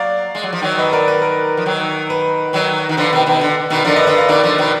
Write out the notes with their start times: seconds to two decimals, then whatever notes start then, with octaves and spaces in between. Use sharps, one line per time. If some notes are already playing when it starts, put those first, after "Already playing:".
Already playing: F#3 A#3 D5 F5
0.35 G#3
0.43 F#3
0.53 F3
0.61 D#3 F#3
0.78 B4 D#5
0.93 A#4 D5
1.08 B4
1.22 A#4
1.57 F3
1.66 D#3 F#3
2.10 B4
2.53 D#3 F#3
2.89 D#3
2.97 D3 F3 B4
3.13 B2 D#3
3.26 B2 D#3
3.41 D3
3.70 B2 D#3
3.84 D3 F3 A#4 D5
3.96 B4 D#5
4.07 D3 B4 D#5
4.18 D5 F5
4.25 D#5
4.29 B2 D#3 A#4 D5
4.43 D3 F3
4.58 B2 D#3